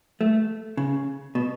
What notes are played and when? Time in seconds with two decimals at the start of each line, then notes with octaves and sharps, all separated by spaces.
0.21 A3
0.77 C#3
1.35 B2